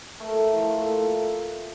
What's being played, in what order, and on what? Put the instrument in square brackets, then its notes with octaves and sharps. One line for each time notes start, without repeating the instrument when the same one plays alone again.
[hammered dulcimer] A3 A#4
A2
F3
A3
A#2